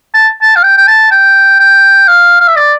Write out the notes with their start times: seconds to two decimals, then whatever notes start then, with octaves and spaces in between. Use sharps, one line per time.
0.14 A5
0.42 A5
0.56 F5
0.63 G5
0.77 G5
0.87 A5
1.11 G5
1.59 G5
2.07 F5
2.39 F5
2.47 E5
2.56 D5